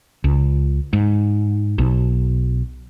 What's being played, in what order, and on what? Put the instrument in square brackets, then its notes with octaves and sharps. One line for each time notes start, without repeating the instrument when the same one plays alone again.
[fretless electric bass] C#2
G#2
B1